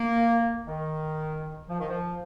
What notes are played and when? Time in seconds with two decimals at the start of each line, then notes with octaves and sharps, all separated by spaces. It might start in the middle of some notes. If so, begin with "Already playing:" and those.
Already playing: A#3
0.66 D#3
1.69 F3
1.79 D#3
1.89 F3